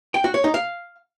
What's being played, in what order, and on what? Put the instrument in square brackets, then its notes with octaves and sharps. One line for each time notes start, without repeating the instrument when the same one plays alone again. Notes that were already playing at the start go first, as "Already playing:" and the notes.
[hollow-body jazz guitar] G5
F#4
C#5
D#4
F5